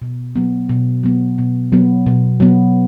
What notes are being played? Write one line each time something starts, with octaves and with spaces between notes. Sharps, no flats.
B2
F#3 B3
B2
F#3 B3
B2
F#3 B3
B2
F#3 B3